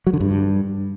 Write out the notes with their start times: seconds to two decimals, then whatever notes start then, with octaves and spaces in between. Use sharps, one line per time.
0.07 F#3
0.14 D3
0.20 G2